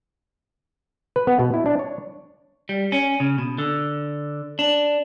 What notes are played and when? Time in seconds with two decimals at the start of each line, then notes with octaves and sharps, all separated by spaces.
1.16 B4
1.27 B3
1.39 B2
1.54 E4
1.66 D4
1.79 C#5
2.69 G3
2.92 C#4
3.20 C#3
3.38 B2
3.58 D3
4.59 D4